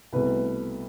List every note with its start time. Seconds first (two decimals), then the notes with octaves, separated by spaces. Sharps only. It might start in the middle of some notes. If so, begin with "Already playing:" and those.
0.13 C2 B2 A3 B4